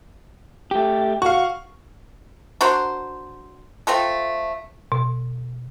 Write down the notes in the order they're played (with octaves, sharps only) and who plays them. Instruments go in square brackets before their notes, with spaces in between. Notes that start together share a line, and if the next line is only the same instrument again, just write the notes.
[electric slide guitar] A3 G4
[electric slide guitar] F#4 [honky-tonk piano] F5 C#6
[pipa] D4 F#4 A#4 C5
A3 C4 F4 A4
[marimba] B2